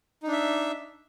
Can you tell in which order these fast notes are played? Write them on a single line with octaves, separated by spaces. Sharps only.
D#4 D4 E5